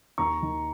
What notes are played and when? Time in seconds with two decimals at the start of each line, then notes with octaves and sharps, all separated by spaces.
0.18 D#2 A#5 C#6
0.43 D#3